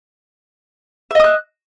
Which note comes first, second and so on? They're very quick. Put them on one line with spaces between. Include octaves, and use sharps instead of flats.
E5 D#5 D#6 F#6